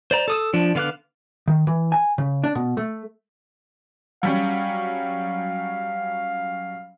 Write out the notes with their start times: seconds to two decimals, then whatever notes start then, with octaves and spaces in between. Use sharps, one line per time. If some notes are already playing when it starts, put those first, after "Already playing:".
0.11 C5 D5 A#5
0.28 A4 D#6 E6
0.54 F3 D4
0.75 D3 B3 F5 D6 F#6
1.48 D#3
1.67 E3
1.92 G#5
2.18 C#3
2.44 D4
2.55 B2
2.77 A3
4.23 F#3 G3 C#4 F5